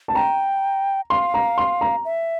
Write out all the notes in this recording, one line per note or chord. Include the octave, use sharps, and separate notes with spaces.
A5
G5 A#5
F5 C6
A#5
C6
A#5
E5